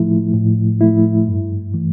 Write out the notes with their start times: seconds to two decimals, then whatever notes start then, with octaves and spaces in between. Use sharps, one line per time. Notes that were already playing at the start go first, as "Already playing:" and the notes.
Already playing: A2 F3 A3 E4
0.34 A2
0.81 F3 A3 E4
1.27 G2
1.74 E3 A3